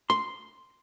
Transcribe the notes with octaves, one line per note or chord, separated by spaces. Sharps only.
C6